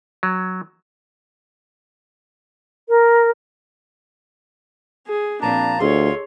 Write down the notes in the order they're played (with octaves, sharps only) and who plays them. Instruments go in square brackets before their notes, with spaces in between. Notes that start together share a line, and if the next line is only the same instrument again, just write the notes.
[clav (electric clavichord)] F#3
[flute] A#4
[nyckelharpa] G#4
[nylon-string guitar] A#2 F3 C4 [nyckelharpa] D4 [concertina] A5 A#5
[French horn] D2 [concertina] F4 [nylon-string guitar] G#4 A4 D#5 [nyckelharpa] C#5 C6